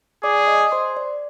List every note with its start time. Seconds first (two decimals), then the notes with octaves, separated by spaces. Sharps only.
0.23 G#4 D5 D6
0.47 D#5 D#6
0.72 C5 C6
0.97 D5